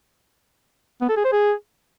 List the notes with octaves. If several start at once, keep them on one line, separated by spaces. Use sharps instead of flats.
B3
A4
G#4
C5
G#4